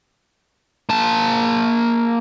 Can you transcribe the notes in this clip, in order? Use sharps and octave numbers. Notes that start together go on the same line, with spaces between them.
A#3 A5